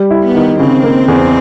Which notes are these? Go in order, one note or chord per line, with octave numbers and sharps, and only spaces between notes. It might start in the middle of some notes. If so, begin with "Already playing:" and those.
Already playing: G3
E4
B3
D#3
C#3 C4
A#3
E2